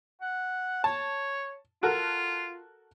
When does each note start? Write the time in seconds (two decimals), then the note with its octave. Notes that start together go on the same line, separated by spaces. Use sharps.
0.21 F#5
0.84 C#5 A5
1.83 F4 F#4 A4 A#4